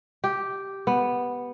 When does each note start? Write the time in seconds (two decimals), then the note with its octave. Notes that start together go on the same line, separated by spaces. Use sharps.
0.24 G4
0.87 B3